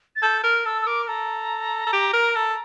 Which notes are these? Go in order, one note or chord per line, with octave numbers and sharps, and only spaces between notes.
A6
A4 G6
A#4 F6
A4 E6
E6
A#4 D6
A4 A#5
A4
G4
A#4
A4